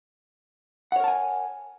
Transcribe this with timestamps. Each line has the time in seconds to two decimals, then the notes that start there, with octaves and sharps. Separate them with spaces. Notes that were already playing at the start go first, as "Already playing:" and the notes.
0.92 F#5
0.96 C#5
1.00 A#4
1.04 A5
1.08 G#5